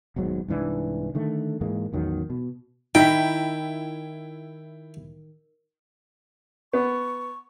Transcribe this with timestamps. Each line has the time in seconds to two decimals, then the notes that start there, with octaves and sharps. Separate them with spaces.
0.16 D#1 B1 G#2 F#3
0.48 C2 G#2 E3 D4
1.15 D3 D#3 A3
1.61 G#2 E3 G#3 A#3
1.93 A1 E2 D#3 F#3
2.30 B2
2.95 D#3 E4 E5 G5 B6
6.73 B3 C#6